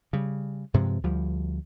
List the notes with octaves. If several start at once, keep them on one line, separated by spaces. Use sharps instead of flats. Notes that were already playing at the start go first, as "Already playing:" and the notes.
C#3 G3
G2 C3 F3 G#3
D2 F3 G3